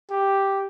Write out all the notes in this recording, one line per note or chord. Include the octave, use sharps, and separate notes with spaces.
G4